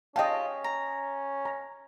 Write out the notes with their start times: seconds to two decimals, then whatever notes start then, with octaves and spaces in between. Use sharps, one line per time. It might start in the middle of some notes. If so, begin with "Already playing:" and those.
0.16 C#4 F4 G4 D#5 G5 A5
0.64 A#5
1.45 A#5